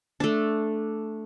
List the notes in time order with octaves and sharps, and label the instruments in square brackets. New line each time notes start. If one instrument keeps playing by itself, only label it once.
[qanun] A3 D4